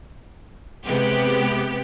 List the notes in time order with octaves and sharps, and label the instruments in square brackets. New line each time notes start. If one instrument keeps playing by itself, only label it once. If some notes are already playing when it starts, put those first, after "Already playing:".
[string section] C3 G#3 B3 G4